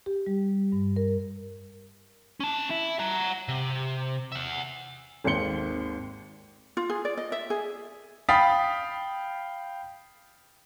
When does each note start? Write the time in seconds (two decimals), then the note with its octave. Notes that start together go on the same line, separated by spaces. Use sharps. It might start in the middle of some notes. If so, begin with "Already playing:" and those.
0.06 G4
0.26 G3
0.72 G2
0.96 A#4
2.40 C#4 A5
2.70 E4
2.99 F#5 A#5
3.49 C3
4.32 E5 F#5
5.24 G#1 D#2 C4 C6 C#7 G7
6.77 F4
6.90 G#4
7.05 D5
7.17 D#5
7.32 E5
7.50 G#4
8.29 F5 G5 B5 D#6 A6 B6